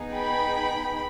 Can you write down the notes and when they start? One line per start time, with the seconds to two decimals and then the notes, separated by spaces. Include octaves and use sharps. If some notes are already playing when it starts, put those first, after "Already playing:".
Already playing: B3 D#4 G#4
0.13 G5 B5